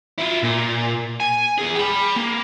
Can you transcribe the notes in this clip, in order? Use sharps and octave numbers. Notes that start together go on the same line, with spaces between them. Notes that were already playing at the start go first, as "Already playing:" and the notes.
E4 F4
A#2
G#5
E2 G#4
G5 B5
A#3